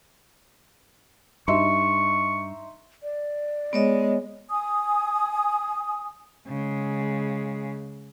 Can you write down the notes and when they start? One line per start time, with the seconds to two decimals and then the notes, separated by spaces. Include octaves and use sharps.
1.48 G2 D#4 E5 C6 C#6
3.03 D5
3.73 G#3 B3 C#5 D#5
4.50 G#5 D#6
6.48 C#3 G#3